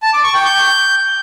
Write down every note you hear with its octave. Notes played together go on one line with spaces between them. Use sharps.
A5
D6
C#6
G5
G6